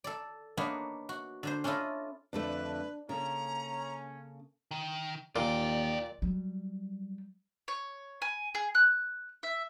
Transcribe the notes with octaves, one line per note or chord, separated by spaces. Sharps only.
A4 D5
A#3 B3 D4 D#4 C#5
F#4
D3 D4 C5
C#4 D4 E4 F4 A4 D#5
F2 D3 A3 D4 B4
C#3 A#3 C#4 A4 A#5
D#3
D#2 A#2 F4 D5 G5
F#3 G3
C#5
G#5
G#4
F#6
E5